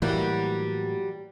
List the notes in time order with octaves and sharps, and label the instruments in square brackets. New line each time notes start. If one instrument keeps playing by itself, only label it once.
[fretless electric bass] A2 E3 A#3 [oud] F#3 G3 G4